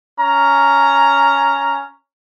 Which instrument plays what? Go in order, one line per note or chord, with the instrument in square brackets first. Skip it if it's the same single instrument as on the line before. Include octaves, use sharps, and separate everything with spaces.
[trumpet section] C#4 A#5